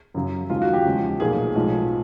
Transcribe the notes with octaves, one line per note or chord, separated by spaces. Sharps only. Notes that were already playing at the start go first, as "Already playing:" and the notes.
F#2 C#3 F#3
D#2 C#3 F3 G#3 F4
F#4
G4
E2 C#3 F3 G#3
B1 A#2 F3 A3 G#4
B1 A2 F3 G#3